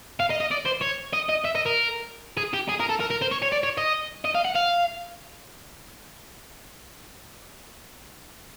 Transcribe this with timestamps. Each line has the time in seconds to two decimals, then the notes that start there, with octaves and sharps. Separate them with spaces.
0.20 F5
0.30 D#5
0.40 D#5
0.51 D5
0.66 C5
0.82 C#5
1.13 D#5
1.29 D#5
1.45 E5
1.55 D#5
1.66 A#4
2.37 G#4
2.54 G4
2.69 G#4
2.80 A#4
2.89 A4
3.00 A#4
3.10 A#4
3.22 C5
3.32 C#5
3.42 C#5
3.52 D5
3.63 C#5
3.78 D#5
4.25 D#5
4.35 F5
4.45 F#5
4.56 F5